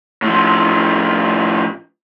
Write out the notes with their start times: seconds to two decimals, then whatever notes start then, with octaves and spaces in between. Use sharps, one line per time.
0.22 A2 F3